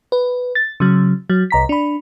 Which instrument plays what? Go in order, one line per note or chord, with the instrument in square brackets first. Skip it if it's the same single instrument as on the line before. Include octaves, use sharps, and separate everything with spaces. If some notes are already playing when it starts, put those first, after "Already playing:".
[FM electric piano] B4
A6
C#3 F#3
F#3
C2 A#5 B6
D4 B5